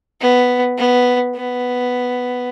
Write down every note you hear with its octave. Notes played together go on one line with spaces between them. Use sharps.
B3
B3
B3